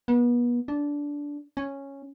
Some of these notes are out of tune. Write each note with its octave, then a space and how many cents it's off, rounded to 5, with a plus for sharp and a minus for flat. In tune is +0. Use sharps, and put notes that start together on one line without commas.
B3 -35
D4 -15
C#4 -5